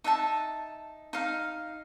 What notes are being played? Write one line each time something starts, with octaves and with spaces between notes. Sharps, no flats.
D#4 E5 F#5 A5
D#4 F5